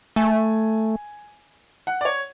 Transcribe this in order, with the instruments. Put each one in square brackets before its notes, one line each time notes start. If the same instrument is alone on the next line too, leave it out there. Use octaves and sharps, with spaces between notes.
[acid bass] A3 [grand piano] G#5
[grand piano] F#5
D5
C#5